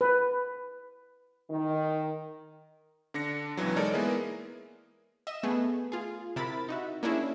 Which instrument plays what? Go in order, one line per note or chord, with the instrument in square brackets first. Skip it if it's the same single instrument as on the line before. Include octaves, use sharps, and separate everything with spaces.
[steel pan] B4
[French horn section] D#3
[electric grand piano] D3 D4 A#6 C#7
C#2 B2 E3 F#3
G#3 D#4 A4 A#4 C#5 D5
G#3 A#3 B3 E4 G#4 A#4
[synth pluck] D#5 E5 E7
A3 B3 G#4
F4 G#4
C3 E4 A#4 B5 A6
D#4 F#4 E5
A#3 C#4 D4 E4 G#4